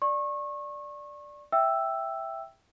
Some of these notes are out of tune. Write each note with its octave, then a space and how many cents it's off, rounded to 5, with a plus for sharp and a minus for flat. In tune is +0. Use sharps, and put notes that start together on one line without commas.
D5 +0 C#6 -30
E5 +0 G5 +0 E6 +5